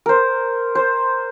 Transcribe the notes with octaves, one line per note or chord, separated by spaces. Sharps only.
A#4 C5
C5